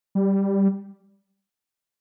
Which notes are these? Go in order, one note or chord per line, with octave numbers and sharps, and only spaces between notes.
G3